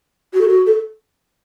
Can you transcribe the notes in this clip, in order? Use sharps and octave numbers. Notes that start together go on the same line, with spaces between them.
F#4
A4
F#4
A4